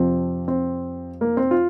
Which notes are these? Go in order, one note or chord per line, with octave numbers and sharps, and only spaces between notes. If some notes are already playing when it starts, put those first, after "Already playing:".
Already playing: F2 C3 F3 C4
C4
A#3
C4
F4